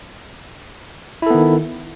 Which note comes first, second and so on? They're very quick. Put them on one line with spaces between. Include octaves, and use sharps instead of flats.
E4 A4 B3 D#3